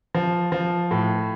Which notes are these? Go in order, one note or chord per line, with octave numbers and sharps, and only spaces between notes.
F3
F3
A2